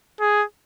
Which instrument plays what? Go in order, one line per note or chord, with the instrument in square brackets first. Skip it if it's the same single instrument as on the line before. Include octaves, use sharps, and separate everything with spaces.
[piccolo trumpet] G#4